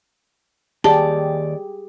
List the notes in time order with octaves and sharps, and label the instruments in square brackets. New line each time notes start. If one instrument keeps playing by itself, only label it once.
[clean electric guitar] D#2 D5 [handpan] G4 G#4 [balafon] A5